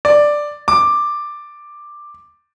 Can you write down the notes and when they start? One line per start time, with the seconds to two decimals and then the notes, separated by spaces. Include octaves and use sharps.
0.05 D5
0.68 D6